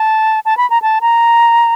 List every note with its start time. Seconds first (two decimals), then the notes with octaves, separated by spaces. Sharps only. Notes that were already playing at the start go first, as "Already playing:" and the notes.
Already playing: A5
0.45 A5
0.57 B5
0.70 A#5
0.82 A5
1.01 A#5